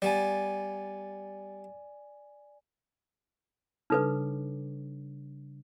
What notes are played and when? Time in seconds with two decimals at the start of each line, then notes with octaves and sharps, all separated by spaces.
0.02 G3 B3 D5 G#5
3.90 C#3 G3 D4 D#4 A4 B4